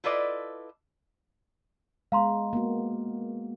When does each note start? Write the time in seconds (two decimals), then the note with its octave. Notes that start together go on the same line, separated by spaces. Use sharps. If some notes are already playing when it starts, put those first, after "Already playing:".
0.04 E4 F4 A4 B4 D5 D#5
2.12 G#3 B3 F5 A#5 C6
2.53 A#3 B3 F#4